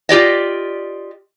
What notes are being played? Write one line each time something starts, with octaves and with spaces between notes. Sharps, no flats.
F4 G4 D5 D#5